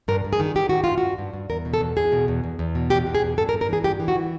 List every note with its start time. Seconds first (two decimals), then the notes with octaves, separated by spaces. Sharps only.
0.08 G2 A#4
0.24 G2
0.33 G#4
0.40 D#3
0.55 D#3 G4
0.69 D#3 F#4
0.84 G2 F4
0.98 G2 F#4
1.18 G2
1.33 G2
1.50 E2 A#4
1.65 B2
1.74 A4
1.81 E2
1.97 E2 G#4
2.12 B2
2.28 E2
2.44 E2
2.59 E2
2.75 B2
2.90 E2 G4
3.07 B2
3.15 G#4
3.22 E2
3.37 G2 A4
3.49 A#4
3.53 G2
3.61 A#4
3.69 E3 G#4
3.84 G2 G4
4.00 E3
4.08 F#4
4.16 E3